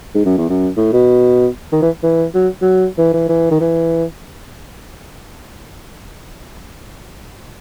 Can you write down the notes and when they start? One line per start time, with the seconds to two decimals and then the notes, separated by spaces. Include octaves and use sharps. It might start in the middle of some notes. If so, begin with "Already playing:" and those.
0.14 G#2
0.25 F#2
0.38 E2
0.50 F#2
0.77 A2
0.93 B2
1.72 D#3
1.82 E3
2.03 E3
2.34 F#3
2.62 F#3
2.98 E3
3.13 E3
3.29 E3
3.51 D#3
3.60 E3